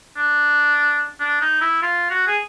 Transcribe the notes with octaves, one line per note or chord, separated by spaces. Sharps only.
D4
D4
D#4
E4
F4
F#4
G#4